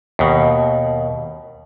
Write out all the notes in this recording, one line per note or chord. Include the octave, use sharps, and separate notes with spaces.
D#2 B2